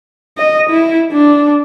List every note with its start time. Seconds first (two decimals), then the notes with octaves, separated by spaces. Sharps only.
0.38 D#5
0.70 E4
1.12 D4